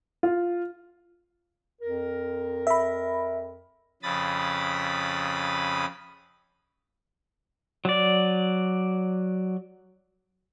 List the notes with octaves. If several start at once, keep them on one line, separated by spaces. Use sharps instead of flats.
F4
F2 A#4
E5 B5
F2 C#3 B5 D#6 A6
F#3 D5